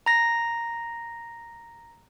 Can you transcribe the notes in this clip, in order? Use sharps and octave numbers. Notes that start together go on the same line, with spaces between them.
A#5 A#6